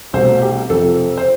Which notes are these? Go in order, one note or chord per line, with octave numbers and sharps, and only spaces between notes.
C2 B2 A3 C5
G4
F2 C3 F3 A4
C5